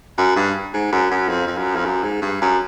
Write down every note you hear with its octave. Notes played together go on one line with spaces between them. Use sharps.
F#2
G2
G#2
F#2
F#2
F2
F2
F#2
F2
F#2
G#2
G2
F#2